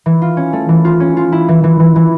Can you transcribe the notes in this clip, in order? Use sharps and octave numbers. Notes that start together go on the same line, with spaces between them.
E3
F4
C#4
A3
E3
F4
C#4
F4
E4
E3
E3
E3
E3